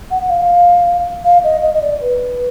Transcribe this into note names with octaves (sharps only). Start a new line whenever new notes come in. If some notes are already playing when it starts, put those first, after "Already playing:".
F#5
F#5
F5
F5
D#5
D#5
D#5
D5
B4